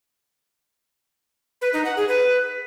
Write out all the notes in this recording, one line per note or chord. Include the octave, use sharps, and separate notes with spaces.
B4
D#4
F#5
G#4
B4